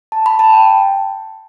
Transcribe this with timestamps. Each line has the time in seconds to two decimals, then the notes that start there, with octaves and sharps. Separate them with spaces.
0.12 A5
0.26 B5
0.39 A5
0.53 G5